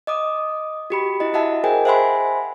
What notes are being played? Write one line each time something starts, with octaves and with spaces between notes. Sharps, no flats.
D#5 D6 D#6
F#4 G4 B5
E4 D#5
F#4 D#5 E5 F#5 A5
G#4 A#4 C5 D#5 G5 G#5
C5 E5 F#5 G#5 B5 C6